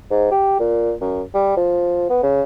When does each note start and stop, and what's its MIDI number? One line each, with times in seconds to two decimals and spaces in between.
0.11 0.29 44
0.31 0.59 67
0.60 0.93 46
1.01 1.22 42
1.34 1.54 55
1.57 2.06 53
2.10 2.22 59
2.23 2.43 49